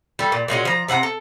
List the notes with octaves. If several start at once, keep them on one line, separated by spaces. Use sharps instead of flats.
G3 A4
A#2
A#2 G#3 C#4 F#4
F3 A#5
C3 C4 F#5 A#5
A4